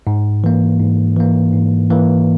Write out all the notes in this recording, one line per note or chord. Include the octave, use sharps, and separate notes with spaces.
G#2
E3 A#3
G#2
E3 A#3
G#2
E3 A#3